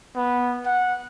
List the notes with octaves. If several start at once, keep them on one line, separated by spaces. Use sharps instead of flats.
B3
F#5